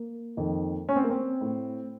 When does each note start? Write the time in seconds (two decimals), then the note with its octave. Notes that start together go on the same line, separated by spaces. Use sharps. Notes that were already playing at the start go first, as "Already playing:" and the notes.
Already playing: A#3
0.37 F2 D#3
0.89 C#4
0.96 C4
1.04 A#3
1.10 C4
1.41 A2